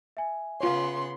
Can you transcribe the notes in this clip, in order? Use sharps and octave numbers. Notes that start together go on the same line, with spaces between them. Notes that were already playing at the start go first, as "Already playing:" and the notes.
E5 G#5
C#3 B3 F4 C#5 C6